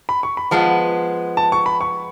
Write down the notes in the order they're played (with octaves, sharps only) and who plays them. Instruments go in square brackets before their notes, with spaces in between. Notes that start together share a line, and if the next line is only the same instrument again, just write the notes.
[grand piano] B5
C#6
B5
[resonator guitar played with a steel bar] F3 G#3 B3 [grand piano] A5
[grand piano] A5
C#6
B5
C#6